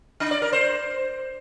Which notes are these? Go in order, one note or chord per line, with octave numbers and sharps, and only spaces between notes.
D4
D5
A#4
C5